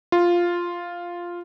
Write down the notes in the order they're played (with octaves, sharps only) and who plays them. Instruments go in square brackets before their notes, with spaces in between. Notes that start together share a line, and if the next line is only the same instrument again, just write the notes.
[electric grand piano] F4